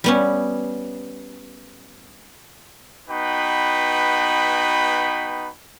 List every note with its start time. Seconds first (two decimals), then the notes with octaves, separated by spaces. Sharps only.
0.04 G3 B3 C#4
3.09 B3 D#4 F#4 B4 G5 B5